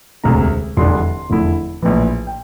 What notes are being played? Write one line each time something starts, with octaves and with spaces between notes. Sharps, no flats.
E1 D2 C3 A#5
F1 E2 D3 G3 D4 C6
F1 E2 D3 A3 E4
A#1 A2 E3
G5